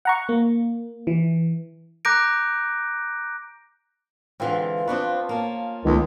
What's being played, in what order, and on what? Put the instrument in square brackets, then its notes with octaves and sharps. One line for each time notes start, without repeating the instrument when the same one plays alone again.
[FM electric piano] F#5 A#5 C#6
A#3
E3
[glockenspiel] A#5 D6 F#6 G6 A#6 D7
[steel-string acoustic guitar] D3 E3 G#3 [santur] C4 F4 F5
[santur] F3 C#6 [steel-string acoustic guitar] C4 D4 B4
[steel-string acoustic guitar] A#3 C#4 [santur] A5
[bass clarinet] C#2 [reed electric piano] D#3 A3 B3